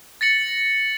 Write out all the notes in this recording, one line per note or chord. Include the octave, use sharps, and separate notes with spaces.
A6 A#6 C#7 F#7